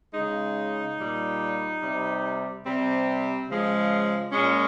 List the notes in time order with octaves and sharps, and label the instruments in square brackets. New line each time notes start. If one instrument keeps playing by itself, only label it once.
[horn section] C#3 G#3 D#4
A#2 G3
C3 G3
C3 G3 C4
C#3 F3 G#3
A#2 G#3 C#4